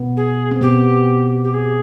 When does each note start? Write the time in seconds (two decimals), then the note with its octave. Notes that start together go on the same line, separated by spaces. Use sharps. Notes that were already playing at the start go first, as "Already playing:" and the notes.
Already playing: B2 B3
0.16 G#4
0.51 C4
0.61 B2 B3 G4
1.44 G4
1.53 G#4